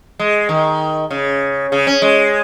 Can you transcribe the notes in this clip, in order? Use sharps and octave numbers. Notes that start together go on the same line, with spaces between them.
G#3
D#3
C#3
C#3
C#4
G#3